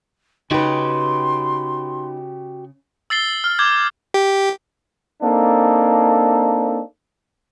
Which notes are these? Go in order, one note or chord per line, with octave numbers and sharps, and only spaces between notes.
C#3 D#4 F#4 G4 B4 G5 C6
E6 A6 C7 G7
F6
D6 G6 G#6
G4
A#3 C4 D4 D#4 A4